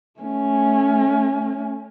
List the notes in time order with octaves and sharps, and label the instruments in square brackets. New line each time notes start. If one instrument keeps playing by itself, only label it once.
[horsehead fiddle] A3 C#4